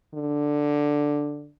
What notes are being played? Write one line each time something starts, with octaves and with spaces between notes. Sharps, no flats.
D3